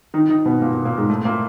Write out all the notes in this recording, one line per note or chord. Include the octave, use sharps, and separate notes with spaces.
D#3 D#4
D#3 D#4
B2 B3
A#2 A#3
A#2 A#3
A#2 A#3
G#2 G#3
A2 A3
A#2 A#3